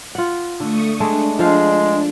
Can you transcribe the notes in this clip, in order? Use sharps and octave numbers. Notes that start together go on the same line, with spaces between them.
F4 F#5
D3 A3 C#6 D#6
G#3 A3 D4
F3 G#3 F5